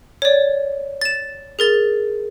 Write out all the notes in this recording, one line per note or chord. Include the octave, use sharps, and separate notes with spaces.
C#5 D5
A6 E7
G#4 A#4 A6